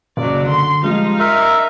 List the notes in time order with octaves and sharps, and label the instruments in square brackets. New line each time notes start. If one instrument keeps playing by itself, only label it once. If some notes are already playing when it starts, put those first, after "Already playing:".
[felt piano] F#1 [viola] F#3 D5
[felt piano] D3 [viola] C6
[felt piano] F3 G3 G#3 [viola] D#4 F5
[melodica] A#4 E5 [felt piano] C6